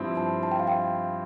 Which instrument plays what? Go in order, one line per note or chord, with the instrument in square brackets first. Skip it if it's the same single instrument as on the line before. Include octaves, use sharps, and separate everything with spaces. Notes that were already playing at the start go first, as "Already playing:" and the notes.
Already playing: [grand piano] G2 F3 C4 E4
[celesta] A5
A5
G5
F5
G5